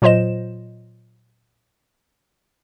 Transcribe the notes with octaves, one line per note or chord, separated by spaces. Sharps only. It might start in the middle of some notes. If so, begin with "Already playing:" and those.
A#2 F#3 F4 C5 D#5 E7